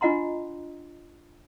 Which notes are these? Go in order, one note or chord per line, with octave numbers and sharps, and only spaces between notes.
D4 F4 D#5 F#5 A#5 C6